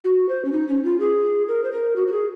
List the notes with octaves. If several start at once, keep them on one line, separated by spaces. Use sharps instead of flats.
F#4
C5
C#4
D#4
C#4
F4
G#4
A#4
C5
A#4
F#4
F#4
G#4